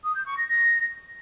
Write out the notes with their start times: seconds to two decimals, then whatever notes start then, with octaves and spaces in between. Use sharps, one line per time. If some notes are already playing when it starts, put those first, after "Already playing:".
0.04 D#6
0.15 G6
0.26 C#6
0.37 A#6
0.48 A#6